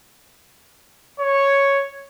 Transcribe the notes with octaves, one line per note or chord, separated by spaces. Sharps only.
C#5